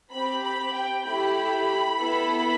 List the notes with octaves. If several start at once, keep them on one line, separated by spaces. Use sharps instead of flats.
C4 G4 B5
B5
G5
A3 E4 G4 B5
B3 E4 A4